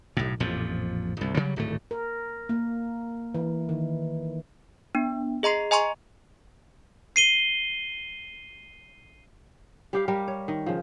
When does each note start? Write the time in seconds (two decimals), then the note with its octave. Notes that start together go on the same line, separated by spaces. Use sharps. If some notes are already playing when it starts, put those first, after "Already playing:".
0.17 B1 A2
0.40 A1 F2 A#2 F3
1.17 G1 C2
1.35 C#3 F#3 G3
1.56 D1 G#1 A3
1.91 A#4
2.49 A#3
3.34 E3
3.69 D#3
4.95 B3 D4
5.43 G#4 D#5 A#5 C6 C7
5.71 D#5 G#5 A#5 C6 C#6
7.16 C7 D#7 G7
9.93 G3 G4 F5
10.08 G3 G4 A#4
10.28 C#5
10.48 D#3
10.66 C#3 F3